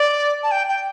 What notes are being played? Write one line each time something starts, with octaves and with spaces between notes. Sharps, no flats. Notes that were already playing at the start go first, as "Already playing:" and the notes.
Already playing: D5
A5
G5
G5